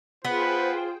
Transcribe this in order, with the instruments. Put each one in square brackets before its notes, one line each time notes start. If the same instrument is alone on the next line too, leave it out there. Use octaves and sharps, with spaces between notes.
[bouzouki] B3 [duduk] F4 [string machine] G#4 C5 G5 [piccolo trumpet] B4